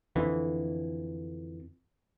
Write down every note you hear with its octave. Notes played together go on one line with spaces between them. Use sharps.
F2 D3 E3